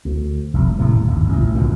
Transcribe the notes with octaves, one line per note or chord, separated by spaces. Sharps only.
D2
F1 C2
D#1 A2 C3 A3
G1 D#2
A1 A#2
G1 C#2 B2 D#3